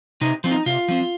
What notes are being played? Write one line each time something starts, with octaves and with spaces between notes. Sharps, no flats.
C3 D#4
F3 C4
D#4
C3 F4
F3 C4